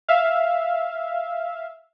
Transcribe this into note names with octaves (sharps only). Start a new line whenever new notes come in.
E5 F5